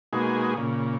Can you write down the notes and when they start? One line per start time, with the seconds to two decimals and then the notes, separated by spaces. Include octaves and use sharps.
0.13 B2 G#3 A#3 D#4 F#4 G#4
0.57 A#2 C#3